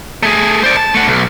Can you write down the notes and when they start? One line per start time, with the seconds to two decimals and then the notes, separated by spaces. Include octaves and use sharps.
0.23 A3 G#4
0.64 C5 D5
0.77 A5
0.95 A3 F#5
1.08 B1